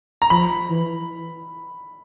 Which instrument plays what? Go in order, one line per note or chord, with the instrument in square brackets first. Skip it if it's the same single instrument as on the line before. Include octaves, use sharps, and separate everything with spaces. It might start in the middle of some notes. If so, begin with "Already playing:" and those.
[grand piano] A#5
[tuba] F3 [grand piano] B5
[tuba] E3